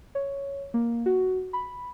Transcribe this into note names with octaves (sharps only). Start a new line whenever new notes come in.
C#5
A#3
F#4
B5